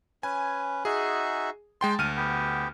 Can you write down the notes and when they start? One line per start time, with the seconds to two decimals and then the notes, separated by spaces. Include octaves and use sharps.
0.23 C#4 B4 G#5
0.85 D#4 F#4 G#4 E5
1.81 G#3 G5 A5 C6
1.99 D2 F6 D#7
2.16 B3 G4